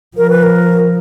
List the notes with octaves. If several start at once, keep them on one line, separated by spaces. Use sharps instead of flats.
F3 A#4
B4
A#4